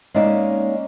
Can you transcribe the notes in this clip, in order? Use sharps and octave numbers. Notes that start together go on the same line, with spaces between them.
G#3 A#3 C#4 D#4 D5 E5